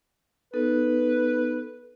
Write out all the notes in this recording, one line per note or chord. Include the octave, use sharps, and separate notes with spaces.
B3 D#4 A4 B4